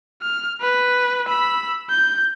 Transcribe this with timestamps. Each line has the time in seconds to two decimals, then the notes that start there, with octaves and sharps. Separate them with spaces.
0.22 F6
0.61 B4
1.27 B5 E6
1.90 G6